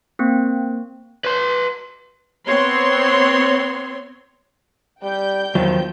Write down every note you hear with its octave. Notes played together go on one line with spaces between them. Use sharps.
A#3 C4
B4 C6
B3 C4 C#5 C6
G3 G5 G6
E2 D#3 F3 F#3